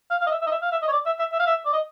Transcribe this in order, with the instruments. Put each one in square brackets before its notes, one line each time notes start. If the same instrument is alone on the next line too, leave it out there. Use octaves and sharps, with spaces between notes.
[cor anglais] F5
F5
D#5
E5
E5
D#5
E5
F5
E5
D#5
C#5
D5
E5
E5
E5
F5
E5
D5
D#5